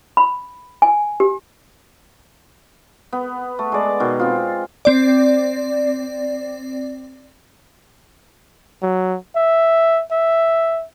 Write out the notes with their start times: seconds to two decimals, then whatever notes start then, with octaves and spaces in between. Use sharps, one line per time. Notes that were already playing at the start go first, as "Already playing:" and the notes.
0.17 B5
0.82 G#5
1.20 G4
3.12 B3
3.59 A3
3.72 G#3 D5
4.00 B2 D#3
4.19 C4 F4
4.85 C4 D5
8.82 F#3
9.36 E5
10.11 E5